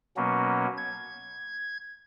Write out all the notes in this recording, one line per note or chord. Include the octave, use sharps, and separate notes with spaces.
B2 F#3 A#3 B3 C#4
G#6